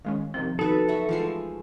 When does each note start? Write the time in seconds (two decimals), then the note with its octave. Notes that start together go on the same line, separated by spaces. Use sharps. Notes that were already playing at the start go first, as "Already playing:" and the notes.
0.05 D#3 G#3 C#4 F5
0.34 C3 D#3 F3 C4
0.59 B3 D#4 F#4 A4 B4
0.88 F#3 F#4 B4 E5
1.09 E3 F3 G#3 A3 C7